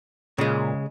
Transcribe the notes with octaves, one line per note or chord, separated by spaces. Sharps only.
A#2 C#3 G#3